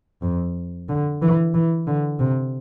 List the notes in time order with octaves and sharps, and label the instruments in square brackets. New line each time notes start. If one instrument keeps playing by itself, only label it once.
[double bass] F2
D3
E3
E3
D3
C3